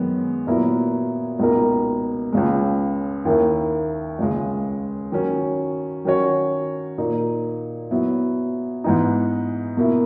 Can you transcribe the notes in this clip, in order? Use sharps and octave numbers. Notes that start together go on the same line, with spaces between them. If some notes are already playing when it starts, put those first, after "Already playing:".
Already playing: F#2 D#3 G#3 B3
A#2 F#3 B3 E4 A#4
C#2 B2 A#3 D#4 A#4
C#2 C#3 G#3
D#2 D#3 A#3 E4
C#2 C#3 G#3
D#3 F#3 C#4
D#3 F#3 C#4 F#4 C#5
A#2 A#3 D#4
F#3 B3 E4
G#2 E3 B3 D#4
B2 A#3 E4